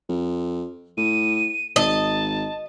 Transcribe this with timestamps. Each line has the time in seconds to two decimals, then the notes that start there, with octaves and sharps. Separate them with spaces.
0.09 F2
0.98 A2 D#7
1.76 G#1 D#5 A5